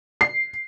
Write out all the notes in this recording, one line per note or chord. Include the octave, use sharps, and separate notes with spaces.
C7